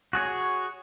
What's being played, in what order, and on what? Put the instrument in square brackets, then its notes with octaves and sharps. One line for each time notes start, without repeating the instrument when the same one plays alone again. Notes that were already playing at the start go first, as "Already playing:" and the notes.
[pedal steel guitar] F#4 G#4 C#5